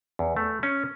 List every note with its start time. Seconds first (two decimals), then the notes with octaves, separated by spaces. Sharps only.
0.19 E2
0.37 A3
0.63 C#4